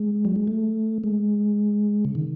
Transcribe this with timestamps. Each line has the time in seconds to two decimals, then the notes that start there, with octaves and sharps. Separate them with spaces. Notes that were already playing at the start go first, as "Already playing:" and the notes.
Already playing: G#3
0.25 F#3
0.36 G#3
0.48 A3
1.04 G#3
2.05 C#3
2.15 D#3